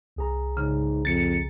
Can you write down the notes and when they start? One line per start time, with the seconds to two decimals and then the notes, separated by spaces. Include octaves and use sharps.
0.16 C2 G#4 A#5
0.57 G#2 C#3
1.05 F2 A6 C#7